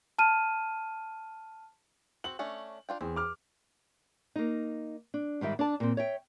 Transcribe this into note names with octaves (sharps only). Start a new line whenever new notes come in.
A5 F6 D#7
C4 F#4 F#7
A3 C#4 D4
D4 F4 G5
E2 C4
D6 F6
A#3 D#4
D4
G#2 D#3 G3 E5
D4 D5 A5
A#2 C4
C#5 E5 G5